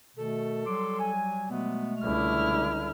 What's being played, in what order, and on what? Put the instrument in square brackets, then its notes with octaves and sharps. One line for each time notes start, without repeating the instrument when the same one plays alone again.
[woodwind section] B2 D#3 A3 [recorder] A4
[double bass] F#3 G3 [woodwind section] C6 D6
[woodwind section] G#5
[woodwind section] B2 G#3 A3 [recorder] B3
[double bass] C#2 D3 [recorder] G3 [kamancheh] E4 F6